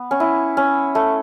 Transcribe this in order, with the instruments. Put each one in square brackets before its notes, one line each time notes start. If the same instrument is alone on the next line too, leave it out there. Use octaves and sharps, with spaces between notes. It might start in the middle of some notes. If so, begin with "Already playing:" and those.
Already playing: [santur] B3
C#4
E4
C#4
A3